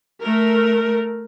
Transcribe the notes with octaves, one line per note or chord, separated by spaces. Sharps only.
A3 A#4